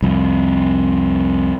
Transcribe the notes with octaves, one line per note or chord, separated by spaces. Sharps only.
C2 F2